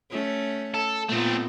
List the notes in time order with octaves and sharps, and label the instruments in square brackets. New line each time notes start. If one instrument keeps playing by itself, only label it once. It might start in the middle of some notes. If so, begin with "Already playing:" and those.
[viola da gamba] A3 C#4
[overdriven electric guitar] A4
[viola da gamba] A#2 B3 [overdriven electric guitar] A3 C4